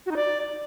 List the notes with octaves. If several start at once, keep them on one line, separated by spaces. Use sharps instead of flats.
F#4
D#4
D5